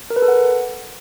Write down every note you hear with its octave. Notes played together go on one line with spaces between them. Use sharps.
A#4
B4
A4
F#5